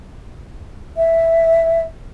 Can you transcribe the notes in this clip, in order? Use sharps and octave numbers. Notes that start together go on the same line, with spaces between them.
E5